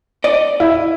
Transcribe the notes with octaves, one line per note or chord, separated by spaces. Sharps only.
D5 D#5
E4